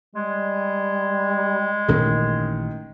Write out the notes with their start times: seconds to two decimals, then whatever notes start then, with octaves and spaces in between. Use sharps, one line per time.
0.15 G3 G#3
1.88 A1 A#2 D#3 C#4